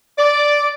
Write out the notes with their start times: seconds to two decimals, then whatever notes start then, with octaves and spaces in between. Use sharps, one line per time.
0.18 D5